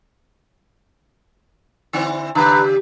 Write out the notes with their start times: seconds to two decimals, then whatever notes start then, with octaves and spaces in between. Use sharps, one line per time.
1.93 D3 C4 E4
2.35 C#3 D4 G4 B4 A#5